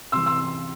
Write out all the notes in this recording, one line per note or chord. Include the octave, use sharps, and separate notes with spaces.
C3 E3 C6 E6
C6 E6